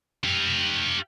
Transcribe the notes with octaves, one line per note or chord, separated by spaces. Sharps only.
G4 F5